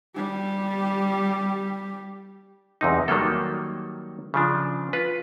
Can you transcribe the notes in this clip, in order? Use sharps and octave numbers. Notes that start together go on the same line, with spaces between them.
G3 G4
E2 C3 D#4
D#3 F#3 G3 A#3 A4
C#3 F3 D4
F4 B4